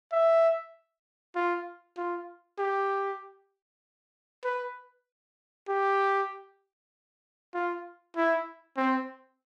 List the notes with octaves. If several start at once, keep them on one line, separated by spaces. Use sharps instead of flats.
E5
F4
F4
G4
B4
G4
F4
E4
C4